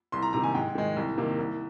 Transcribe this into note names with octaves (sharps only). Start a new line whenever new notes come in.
C2 C6
A#5
C3 D#3 A#5
G#5
G#2 G5
D#3 G#3
C2
C3 D#3 A#3
C2